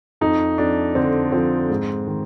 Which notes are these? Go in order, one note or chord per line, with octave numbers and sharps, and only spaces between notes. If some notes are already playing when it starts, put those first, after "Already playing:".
F2 D#4
F2 D4
D3 C4
F3 C4
G#2
D#3